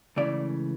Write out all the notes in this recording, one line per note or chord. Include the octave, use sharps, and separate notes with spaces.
C#2 C#3 E3 A3 D5